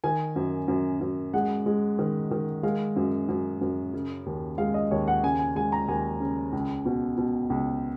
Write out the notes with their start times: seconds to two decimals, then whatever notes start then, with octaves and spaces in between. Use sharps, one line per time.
0.04 D#3 G#5
0.36 F#2
0.68 F#2
1.01 F#2
1.34 G#3 F#5
1.66 G#3
1.99 D#3
2.31 D#3
2.63 G#3 F5
2.96 F#2
3.29 F#2
3.61 F#2
3.94 C#3
4.26 D#2
4.58 G#3 F5
4.74 D#5
4.91 D#2 C#5
5.07 F#5
5.23 C#3 G#5
5.39 G#5
5.55 G#3 G#5
5.72 A#5
5.88 D#2 G#5
6.20 C#3
6.53 C#2
6.85 B2
7.17 B2
7.50 C#2